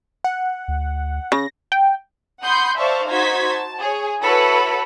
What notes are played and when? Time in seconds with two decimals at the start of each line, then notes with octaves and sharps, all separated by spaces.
0.24 F#5
0.68 D2
1.32 C#3 A#6
1.72 G5
2.42 F#5 B5 C6 D#6 G6
2.78 C5 D5 E5 F5 A5 C#6
3.08 D#4 F#4 C5 G#6 B6
3.49 A5
3.80 G#4 C#5
4.22 E4 F#4 A4 B4 C#5 B5